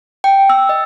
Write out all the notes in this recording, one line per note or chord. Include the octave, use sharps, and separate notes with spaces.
G5
E6
D#5